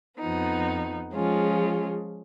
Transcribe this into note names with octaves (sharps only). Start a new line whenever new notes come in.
F2 F3 B3 D#4
F3 G#3 C#4 F4